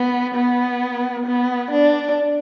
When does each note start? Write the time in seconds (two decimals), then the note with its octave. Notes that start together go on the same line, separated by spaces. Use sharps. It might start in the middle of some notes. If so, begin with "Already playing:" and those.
Already playing: B3
0.35 B3
1.26 B3
1.71 D4